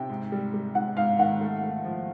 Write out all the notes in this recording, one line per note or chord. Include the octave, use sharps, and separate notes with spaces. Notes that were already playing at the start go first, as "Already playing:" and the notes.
Already playing: C3 G5
G#2
G3
G3
G#2 F#5
G#2 F5
D#3 F#5
A3
A3
F3